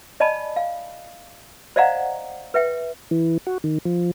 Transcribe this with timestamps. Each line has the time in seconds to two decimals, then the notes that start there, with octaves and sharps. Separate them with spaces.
0.20 D5 D#5 G#5 A5 B5
0.56 F5
1.76 C5 D5 D#5 F5 F#5 A#5
2.54 B4 E5 G5
3.11 E3
3.47 F#4
3.64 D#3
3.85 F3